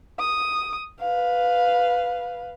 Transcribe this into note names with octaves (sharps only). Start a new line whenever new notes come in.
D#6
B4 F5